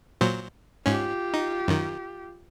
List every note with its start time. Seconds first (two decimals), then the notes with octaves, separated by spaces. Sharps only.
0.21 A#2 F#3 C5
0.86 G#2 C#4 F4 G4
1.34 D#4
1.68 F#2 D#3